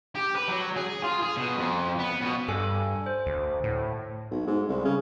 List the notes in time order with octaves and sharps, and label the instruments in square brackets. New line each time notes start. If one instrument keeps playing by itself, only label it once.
[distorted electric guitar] G4
B4
F#3
G#4
F4
G#4
B2
F2
B3
B2
[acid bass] G2 [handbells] A4 G#5
[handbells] C5
[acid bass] D2
A2
[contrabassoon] B1
G#2
C2
C#3